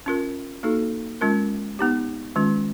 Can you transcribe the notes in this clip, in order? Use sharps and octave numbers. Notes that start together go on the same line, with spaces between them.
C#4 F4 A#4
A#3 D#4 F#4 A4
G#3 C#4 F4 A#4
B3 D#4 G4
D#3 G#3 C#4 F4